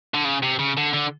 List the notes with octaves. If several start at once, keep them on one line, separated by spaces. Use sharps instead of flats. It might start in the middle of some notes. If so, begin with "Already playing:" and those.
D3
C#3
C3
C#3
D3
D3